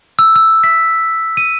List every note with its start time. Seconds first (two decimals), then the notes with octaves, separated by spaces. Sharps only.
0.19 E6
0.36 E6
0.64 B6
1.37 D#7